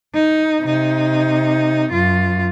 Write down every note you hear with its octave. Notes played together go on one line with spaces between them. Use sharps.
D#4
C3 D#4
F#2 F4